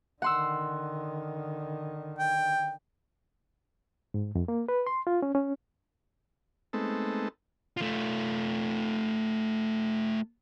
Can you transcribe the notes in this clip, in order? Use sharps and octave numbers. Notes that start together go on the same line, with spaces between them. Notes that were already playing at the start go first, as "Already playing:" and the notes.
D3 D#3 F#5 C6 E6
G5
G#2
F2
A#3
B4
C6
F4
C#4
C#4
G#3 A3 B3 C4 D#4 A4
A3 F4